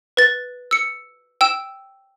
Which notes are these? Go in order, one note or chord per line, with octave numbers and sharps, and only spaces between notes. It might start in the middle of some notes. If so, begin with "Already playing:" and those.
B4 A6
E6 C#7
G5 E6 E7